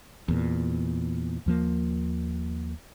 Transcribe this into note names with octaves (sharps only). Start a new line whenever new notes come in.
E2 A#2
D#2 F3 A#3